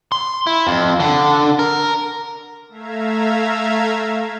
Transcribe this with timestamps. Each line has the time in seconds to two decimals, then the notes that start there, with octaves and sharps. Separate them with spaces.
0.12 C6
0.47 E4
0.67 F2
1.00 D3
1.59 A#4
2.69 A3 E5 F5 A#5 G#6